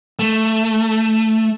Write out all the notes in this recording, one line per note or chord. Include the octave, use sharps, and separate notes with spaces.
A3